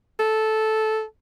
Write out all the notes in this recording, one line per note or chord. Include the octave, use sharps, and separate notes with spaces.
A4